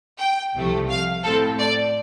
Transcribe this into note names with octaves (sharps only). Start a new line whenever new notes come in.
G5
C2 C3 F3 A3
F5
A2 A3 C4 A4
D5